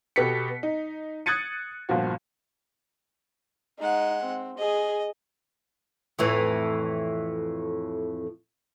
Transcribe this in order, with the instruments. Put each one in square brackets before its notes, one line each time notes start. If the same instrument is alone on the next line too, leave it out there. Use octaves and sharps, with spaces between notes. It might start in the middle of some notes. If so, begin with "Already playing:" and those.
[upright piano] B2 B3 G4 A4 B6 C#7
D#4
D#6 F#6 G#6 A6 C#7 D#7
G1 A#2 F3 F#4
[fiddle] G#3 F#5 [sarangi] D#4
[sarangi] C4
[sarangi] G#4 [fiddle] D#5
[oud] F2 A2 E3